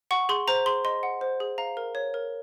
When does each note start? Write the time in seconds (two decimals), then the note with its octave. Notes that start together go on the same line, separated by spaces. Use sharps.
0.11 F#5 C#6
0.29 G#4 C6
0.48 C5 A#5
0.66 G#4 C6
0.85 D#5 C6
1.03 F#5
1.21 C5
1.40 G#4
1.58 F5 A#5
1.77 A#4
1.95 C#5
2.14 A#4